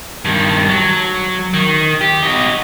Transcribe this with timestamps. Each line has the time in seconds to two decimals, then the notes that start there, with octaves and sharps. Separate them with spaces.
0.25 G2 D#3
0.69 F#3
1.54 D#3
2.01 G4
2.23 D#4 F#4